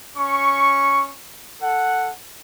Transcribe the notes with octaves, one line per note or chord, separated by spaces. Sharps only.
C#4 C#6
A4 F#5